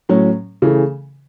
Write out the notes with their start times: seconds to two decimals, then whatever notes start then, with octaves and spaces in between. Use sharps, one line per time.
0.09 A2 F#3 C#4
0.62 C#3 E3 A3